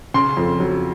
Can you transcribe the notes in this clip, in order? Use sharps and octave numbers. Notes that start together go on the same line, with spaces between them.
C#3 C6
F2
F#3